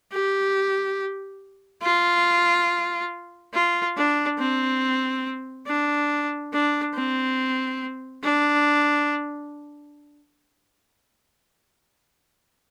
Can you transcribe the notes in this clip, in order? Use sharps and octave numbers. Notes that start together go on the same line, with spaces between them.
G4
F4
F4
D4
C4
D4
D4
C4
D4